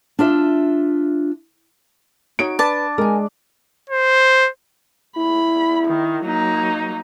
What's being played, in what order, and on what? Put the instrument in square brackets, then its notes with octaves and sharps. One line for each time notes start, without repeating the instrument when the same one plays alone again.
[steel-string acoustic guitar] D4 F4 E5
[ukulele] D#4 F#4 C#5 [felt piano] D7
[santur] D4 [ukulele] B4 [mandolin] A5
[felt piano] G#3 [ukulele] A#4 G#5
[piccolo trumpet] C5
[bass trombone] E4 [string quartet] B5
[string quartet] D#3
F#3 A#3 D#4